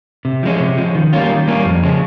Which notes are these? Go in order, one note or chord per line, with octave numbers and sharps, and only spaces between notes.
C3
F3 G#3 C#4
C3
F3 G#3 C#4
D#3
G3 A#3 C#4 F4
D#3
G3 A#3 C#4 F4
F2
C#3 F3 G#3 C#4